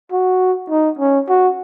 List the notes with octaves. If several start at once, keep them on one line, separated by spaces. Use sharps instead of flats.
F#4
D#4
C#4
F#4